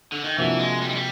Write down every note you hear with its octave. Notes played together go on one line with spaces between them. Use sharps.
D3
D#3
C3 E3 F3 A#3 D4 F#4
G#3
G3
G#3
G3